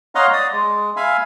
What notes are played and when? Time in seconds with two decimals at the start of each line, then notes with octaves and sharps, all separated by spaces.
0.15 C#5 D#5 F5 F#5 A#5 C6
0.33 D5 D#6
0.52 G#3
0.96 E5 F5 G#5 B5